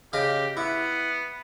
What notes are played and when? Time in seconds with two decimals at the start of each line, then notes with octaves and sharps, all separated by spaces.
0.13 C#3 G4 D#5 F5
0.57 B3 E4